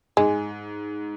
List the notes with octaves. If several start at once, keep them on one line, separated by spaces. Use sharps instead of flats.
G#2 G#3